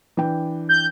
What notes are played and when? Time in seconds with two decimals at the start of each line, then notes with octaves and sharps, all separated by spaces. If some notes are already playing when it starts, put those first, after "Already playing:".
0.17 E3 D4 G5
0.69 G6